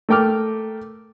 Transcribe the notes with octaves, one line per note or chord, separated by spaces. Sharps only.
A3 A#4 G5 D6 F6